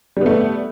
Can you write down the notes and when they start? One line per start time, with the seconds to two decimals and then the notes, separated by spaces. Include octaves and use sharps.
0.17 G3
0.21 B3
0.26 A3